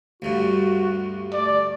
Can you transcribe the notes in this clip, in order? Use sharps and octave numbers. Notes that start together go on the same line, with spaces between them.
D2 G2 F#4
A3 D5